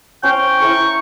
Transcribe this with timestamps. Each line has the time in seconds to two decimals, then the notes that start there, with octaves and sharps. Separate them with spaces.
0.23 C#4 C5 C#5 G5
0.60 E4 A#4 C#5 C#6